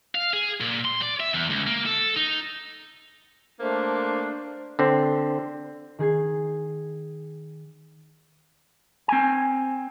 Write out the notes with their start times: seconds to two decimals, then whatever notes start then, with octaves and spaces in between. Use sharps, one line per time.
0.15 F5
0.33 G#4
0.61 A#2
0.85 C6
1.02 D5
1.20 E5
1.34 E2
1.50 C#2
1.67 A#3
1.86 A4
2.16 D#4
3.60 A3 A#3 D4 C5
4.79 D3 C4
5.99 D#3 G#4 G#6 C7
9.08 C4 G#5